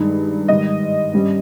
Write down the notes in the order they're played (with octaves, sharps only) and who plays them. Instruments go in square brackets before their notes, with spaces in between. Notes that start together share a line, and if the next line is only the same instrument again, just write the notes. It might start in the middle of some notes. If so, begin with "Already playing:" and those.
Already playing: [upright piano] G2 D#3 G#3 D#4
G#2 D#3 G3 D#5
G2 G3 C#4